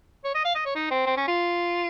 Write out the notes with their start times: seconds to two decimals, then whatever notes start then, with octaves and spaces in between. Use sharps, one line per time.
0.25 C#5
0.35 D#5
0.45 F5
0.55 D#5
0.66 C#5
0.75 D#4
0.91 C4
1.06 C4
1.17 C#4
1.28 F4